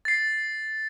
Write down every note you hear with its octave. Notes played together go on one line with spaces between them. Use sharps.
A6 C7